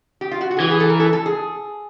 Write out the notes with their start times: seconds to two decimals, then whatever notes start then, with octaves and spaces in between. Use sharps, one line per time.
0.21 G4
0.32 F4
0.41 F#4
0.51 F#4
0.57 G#4
0.60 E3 G4
0.70 G#4
0.80 A4
0.90 A#4
1.00 A4
1.13 A4
1.26 G#4